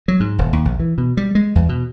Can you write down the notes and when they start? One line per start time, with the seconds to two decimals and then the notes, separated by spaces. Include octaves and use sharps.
0.08 F#3
0.20 G#2
0.38 D#1
0.53 D#2
0.65 A#1
0.79 E3
0.98 B2
1.17 G3
1.35 G#3
1.55 E2
1.69 B2